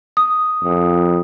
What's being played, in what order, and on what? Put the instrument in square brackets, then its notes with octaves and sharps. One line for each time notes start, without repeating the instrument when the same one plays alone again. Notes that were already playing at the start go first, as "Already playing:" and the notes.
[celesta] D#6
[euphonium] F2